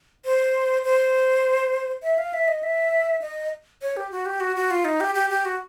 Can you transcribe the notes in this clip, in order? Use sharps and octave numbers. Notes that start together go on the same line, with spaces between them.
C5
C5
E5
F5
E5
D#5
E5
D#5
C#5
G4
F#4
G4
F#4
F#4
F4
D#4
G4
G4
G4
F#4